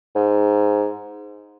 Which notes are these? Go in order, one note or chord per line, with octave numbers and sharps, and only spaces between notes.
G#2